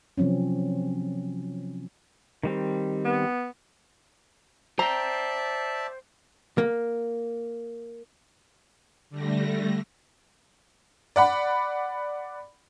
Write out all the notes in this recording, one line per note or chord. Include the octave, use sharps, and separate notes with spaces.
C3 F3 F#3 C4 C#4
D#3 G3 C4
B3
C5 D5 E5 G5 A5 A#5
A#3
D3 G3 A3 A#6
D5 F#5 B5